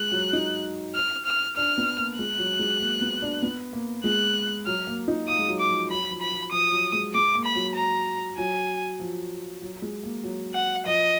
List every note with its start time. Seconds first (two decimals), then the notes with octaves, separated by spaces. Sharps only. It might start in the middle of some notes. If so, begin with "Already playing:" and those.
Already playing: G#3 F#6
0.12 F#3
0.33 D#4
0.95 F6
1.26 F6
1.56 D4 F6
1.78 B3
1.98 A#3
2.18 G#3 F#6
2.38 F#3
2.59 G#3
2.80 A#3
3.01 B3
3.22 D4
3.42 B3
3.73 A#3
4.04 G#3 F#6
4.66 F#3 F6
4.87 A#3
5.08 D#4
5.28 F4 D#6
5.39 G#3
5.48 F#3
5.60 D6
5.69 F3
5.90 F#3 B5
6.11 F3
6.21 B5
6.32 F3
6.52 F3 D#6
6.72 F#3
6.93 G#3
7.14 G#3 D6
7.35 A#3
7.45 B5
7.55 F#3
7.75 A#5
8.37 F#3 G#5
9.00 F3
9.62 F#3
9.82 G#3
10.03 A#3
10.23 F#3
10.54 F#5
10.86 F3 D#5